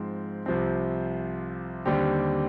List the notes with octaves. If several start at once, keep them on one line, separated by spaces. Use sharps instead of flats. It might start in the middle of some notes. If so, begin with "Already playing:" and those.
Already playing: G#2 F3 C4
C2 C3 F3 C4
D#2 D3 G3 C4 G4